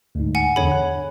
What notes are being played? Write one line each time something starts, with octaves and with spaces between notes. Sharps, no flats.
D2 G#2
F#5 G#5
E2 D3 G#4 C#5 B5
F#5